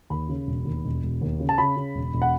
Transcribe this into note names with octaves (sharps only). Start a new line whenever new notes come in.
D#2 B5
C#3
E1
D#2
E1
E1
D#2
C#3
A5
C#3 B5
C#3
E1
E1
F#5